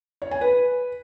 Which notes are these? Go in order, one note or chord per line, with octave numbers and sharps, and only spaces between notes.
C#5
G#5
B4